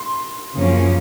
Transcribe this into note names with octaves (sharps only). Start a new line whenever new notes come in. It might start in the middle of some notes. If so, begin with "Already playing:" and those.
Already playing: C6
F#2 C#3 F3 A#3 C#4